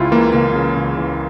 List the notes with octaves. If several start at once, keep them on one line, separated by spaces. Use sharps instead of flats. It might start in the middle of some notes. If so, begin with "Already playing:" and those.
Already playing: C#2 C#3 E4 F4
E3 A#3
C#2 A#3
C#3
C#2
E3